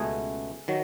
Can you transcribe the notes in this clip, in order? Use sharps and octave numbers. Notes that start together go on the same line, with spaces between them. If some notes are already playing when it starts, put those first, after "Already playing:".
Already playing: C#2 B2 A3 G#4
D#3 F#3